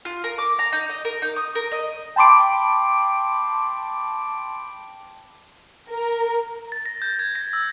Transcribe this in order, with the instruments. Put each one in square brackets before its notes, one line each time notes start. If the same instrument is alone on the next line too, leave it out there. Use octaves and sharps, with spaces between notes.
[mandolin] F4
A#4
D6
A#5
D#4
D#5
A#4
D#4
D#6
A#4
D#5
[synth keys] G5 A5 B5 C6 D6 D7
[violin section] A#4
[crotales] A6
A#6
G6
G#6
A#6
E6